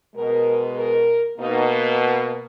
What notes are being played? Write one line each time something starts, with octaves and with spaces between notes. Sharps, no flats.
B2 G#3 A#4
A#4
B2 A#3 D#4